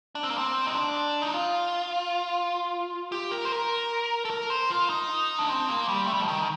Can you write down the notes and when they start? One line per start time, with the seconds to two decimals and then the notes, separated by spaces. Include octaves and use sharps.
0.15 D4
0.23 C4
0.30 A#3
0.38 C4
0.67 D#4
0.74 D4
1.22 D#4
1.34 F4
3.12 G4
3.31 A#4
3.45 C5
3.52 A#4
4.25 A4
4.30 A#4
4.50 C5
4.70 F4
4.90 D#4
5.39 D4
5.49 C4
5.69 A#3
5.88 G3
6.07 A3
6.14 G3
6.20 F3
6.28 D#3